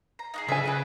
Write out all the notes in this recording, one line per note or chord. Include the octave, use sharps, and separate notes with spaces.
A#5
D#4 F#4 G#4
C#3 D4 F4 G#4 E5 G#5
B4 F#5 E6